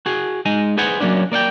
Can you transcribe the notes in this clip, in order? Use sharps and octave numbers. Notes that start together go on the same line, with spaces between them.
F#4 G#4
G#3 D#4 G#5
G#4 B4 C5 F#5 G#5
F#3 G#3 A#3 C#4 D4
A#3 D5 F5 G5